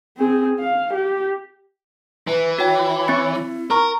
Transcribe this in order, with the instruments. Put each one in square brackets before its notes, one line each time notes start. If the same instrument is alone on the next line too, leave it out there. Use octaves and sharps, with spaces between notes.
[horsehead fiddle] C4 G#4
F5
G4
[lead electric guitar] E3 [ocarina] B4
[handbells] F#4 G5 [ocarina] C#5
[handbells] C4 A6 C#7
[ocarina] E4
[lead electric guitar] A#4 [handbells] A#5 C#6 F6